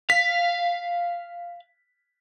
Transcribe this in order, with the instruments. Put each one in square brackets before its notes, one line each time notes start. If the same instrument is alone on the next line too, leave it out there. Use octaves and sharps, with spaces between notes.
[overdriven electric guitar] F5 [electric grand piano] B6